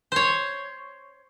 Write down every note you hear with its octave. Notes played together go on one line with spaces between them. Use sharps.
C5 C#5